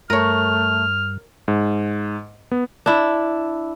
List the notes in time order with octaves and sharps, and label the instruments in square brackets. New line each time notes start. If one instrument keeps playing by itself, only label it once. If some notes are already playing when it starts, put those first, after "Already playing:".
[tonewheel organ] G2 [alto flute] A3 [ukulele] A#4 C#5 [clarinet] F6
[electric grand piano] G#2
B3
[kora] D4 E4